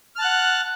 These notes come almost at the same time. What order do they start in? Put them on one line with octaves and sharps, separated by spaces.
F6 A5 F#6 F#5